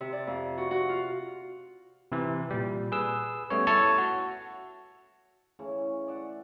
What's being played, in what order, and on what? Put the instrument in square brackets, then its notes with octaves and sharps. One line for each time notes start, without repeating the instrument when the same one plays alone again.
[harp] C3
D5
F2
F#4
F#4
F4
[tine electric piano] C3 E3
A#2 G3
G#4 B4 E6
G3 A3 B3 C#4 C#5
E4 A4 C#5 A5
F#4
[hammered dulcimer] C#3 E3 A3 C#6
D5 E5 F#5